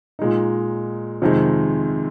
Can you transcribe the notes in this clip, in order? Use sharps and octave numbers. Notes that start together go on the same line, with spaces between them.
A#2 G#3 D#4
F2 C3 D#3 G#3